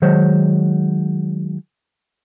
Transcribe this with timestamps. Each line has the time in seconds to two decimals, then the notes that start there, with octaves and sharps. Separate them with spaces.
0.02 D#3 F#3 G#3 C5 C#5